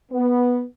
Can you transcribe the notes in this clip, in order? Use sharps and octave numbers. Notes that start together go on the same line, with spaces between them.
B3